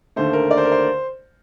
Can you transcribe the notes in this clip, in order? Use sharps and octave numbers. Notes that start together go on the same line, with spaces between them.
D#2 D3 A3 C5
A#4
D5
C5
A#4
C5